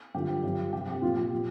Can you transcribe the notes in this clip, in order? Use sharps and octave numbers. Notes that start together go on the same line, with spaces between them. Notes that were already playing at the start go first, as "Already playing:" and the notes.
G2 D3 F3 G4
G2 D3 F3
F2 C3 F3 G4
G4
A#2 F3 F4
G4
A#2 F3